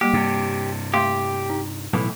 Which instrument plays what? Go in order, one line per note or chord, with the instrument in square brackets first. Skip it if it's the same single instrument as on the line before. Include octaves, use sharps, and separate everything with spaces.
[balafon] G3 A#3 [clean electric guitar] G4
[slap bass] G2 C3
[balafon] A3 F5 C6 [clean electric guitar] G4
[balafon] D#4
[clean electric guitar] B1 A2 E3